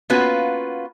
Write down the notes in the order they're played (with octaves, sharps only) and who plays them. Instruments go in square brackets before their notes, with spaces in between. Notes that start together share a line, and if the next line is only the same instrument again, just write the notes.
[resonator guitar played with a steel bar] A#3 B3 C#4 F4 F#4 B4